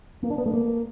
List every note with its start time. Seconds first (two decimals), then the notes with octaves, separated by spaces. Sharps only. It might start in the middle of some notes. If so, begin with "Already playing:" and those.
0.23 A#3
0.30 D4
0.38 B3
0.46 A3
0.53 A#3